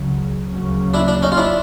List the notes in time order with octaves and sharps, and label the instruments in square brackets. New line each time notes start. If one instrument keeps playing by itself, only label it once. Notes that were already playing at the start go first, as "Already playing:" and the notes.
Already playing: [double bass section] C#2 C#3 F#3
D2 C#3 F#3 A#3 C#4
[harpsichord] D4 E4
D4
C#4 D#4
F4
D4 E4